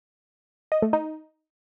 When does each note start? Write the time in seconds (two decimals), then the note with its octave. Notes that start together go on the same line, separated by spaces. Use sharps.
0.72 D#5
0.82 A3
0.93 D#4